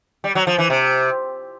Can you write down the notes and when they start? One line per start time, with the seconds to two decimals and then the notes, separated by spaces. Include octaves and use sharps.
0.24 G3
0.35 F#3
0.47 F3
0.58 E3
0.70 C3